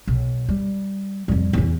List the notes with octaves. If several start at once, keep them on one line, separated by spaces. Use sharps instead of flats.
B1
G3
F2 G3
E2 E3